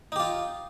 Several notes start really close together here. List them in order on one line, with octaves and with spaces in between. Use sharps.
D#4 G4 F4